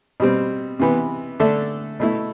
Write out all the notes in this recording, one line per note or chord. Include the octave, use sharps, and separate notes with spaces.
B2 G3 C4
C3 E3 B3
D3 A3 D4 A4 E5
B2 A3 E4